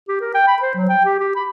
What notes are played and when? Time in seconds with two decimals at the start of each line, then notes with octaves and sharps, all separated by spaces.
0.09 G4
0.21 A#4
0.34 G5
0.47 B5
0.62 C5
0.75 F#3
0.89 G5
1.05 G4
1.20 G4
1.35 B5